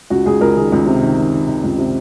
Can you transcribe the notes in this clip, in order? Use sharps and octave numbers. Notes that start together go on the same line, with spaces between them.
C#2 F#4
C#2 G#4
C#2 A#4
D#3 G#4
C#2
C3
D#3
D#3
D#3
D#3
C#2
C3